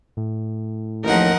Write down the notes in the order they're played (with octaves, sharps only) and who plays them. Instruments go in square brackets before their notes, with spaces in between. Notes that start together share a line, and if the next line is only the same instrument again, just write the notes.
[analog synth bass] A2
[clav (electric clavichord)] A1 D#2 [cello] F3 D#4 [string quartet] A#4 D#5 F#5